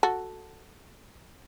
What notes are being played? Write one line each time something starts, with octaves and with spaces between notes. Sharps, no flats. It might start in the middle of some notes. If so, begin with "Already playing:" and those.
F#4 A4